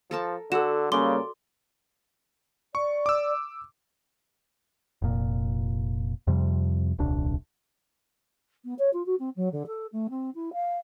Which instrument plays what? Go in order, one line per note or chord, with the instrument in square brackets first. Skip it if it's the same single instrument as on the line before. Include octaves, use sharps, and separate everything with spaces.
[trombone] F3 [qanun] A4 A#4 A5
[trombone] D3 [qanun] F#4 [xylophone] A4 E7
[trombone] C#3 [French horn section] G3 A#3 C#4 [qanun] D5 [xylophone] C6 D6 G7
[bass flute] D5 [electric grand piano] C#6
[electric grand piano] D6 E6
[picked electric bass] F1 A#2
F2 C3 F3 G3
D#1 C2 D4
[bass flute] B3
C#5
F4
F#4
C4
F#3
D3
A4
A3
C4
E4
F5